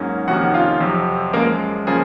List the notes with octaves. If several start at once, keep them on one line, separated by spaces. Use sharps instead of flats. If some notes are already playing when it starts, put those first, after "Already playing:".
Already playing: G#2 F#3 A#3 C#4
F2 C3 D#3 A#3 C#4 F#4 F#5
F4 F5
F2 C3 F#3 C4
F#2 F3 G#3 A#3 A#4
C#3 F3 A#3 C#4 G#4